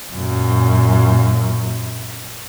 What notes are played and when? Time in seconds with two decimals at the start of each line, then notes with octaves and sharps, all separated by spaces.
0.14 F#2 A#2